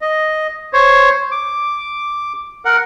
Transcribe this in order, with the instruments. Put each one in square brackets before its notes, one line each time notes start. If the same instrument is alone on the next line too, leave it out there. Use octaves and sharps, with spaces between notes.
[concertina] D#5
C5 C#5
D6
A#4 F#5